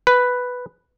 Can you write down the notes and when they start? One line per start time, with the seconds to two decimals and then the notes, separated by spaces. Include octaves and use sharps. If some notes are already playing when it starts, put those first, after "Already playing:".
0.07 B4